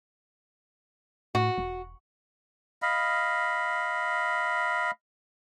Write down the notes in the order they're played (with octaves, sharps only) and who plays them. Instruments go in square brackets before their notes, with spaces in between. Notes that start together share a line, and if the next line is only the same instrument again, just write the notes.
[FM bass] A2 [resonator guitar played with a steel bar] F#4
[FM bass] E1
[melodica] D#5 F5 B5